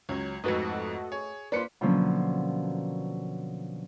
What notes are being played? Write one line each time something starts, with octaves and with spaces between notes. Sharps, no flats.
C#2 F#3 C#4 G#6
F2 G#2 A3 F#4 A4 B4 D#5
G#4 C#5
A#3 F4 B4 C5 D5 B6 C#7
B2 D3 F3 F#3 A#3 C#4